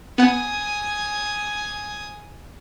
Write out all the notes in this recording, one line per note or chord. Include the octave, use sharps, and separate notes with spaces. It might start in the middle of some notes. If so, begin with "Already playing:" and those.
B3 F#5 G#5 D#6